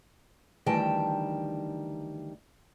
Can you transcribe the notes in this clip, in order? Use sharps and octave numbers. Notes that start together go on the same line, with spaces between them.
D2 D#3 E3 G3 G5 A5